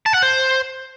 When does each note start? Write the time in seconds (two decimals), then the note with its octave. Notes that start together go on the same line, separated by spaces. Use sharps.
0.06 A5
0.14 F#5
0.23 C5